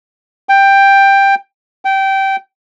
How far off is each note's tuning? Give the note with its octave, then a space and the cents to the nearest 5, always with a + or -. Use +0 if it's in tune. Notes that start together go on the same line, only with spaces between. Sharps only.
G5 +10
G5 -15